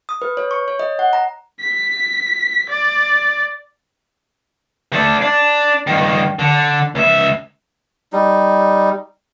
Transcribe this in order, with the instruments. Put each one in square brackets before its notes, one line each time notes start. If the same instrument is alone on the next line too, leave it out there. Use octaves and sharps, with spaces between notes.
[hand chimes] D#6
B4
C#5
C#6
C#5
D#5
F#5
A#5
[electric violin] B6
D5
[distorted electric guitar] A3 D4
D4
G2 D#3
D3
C#2 E5
[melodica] G3 D#4